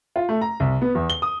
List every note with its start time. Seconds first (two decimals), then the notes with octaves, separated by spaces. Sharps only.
0.16 F4
0.29 A3
0.41 A#5
0.60 C2
0.82 B3
0.95 E2
1.10 G7
1.22 D#6